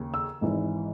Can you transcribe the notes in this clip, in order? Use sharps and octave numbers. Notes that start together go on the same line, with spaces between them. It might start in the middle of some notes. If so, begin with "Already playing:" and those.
Already playing: D#2 C#3
E6
G#1 G#2 E3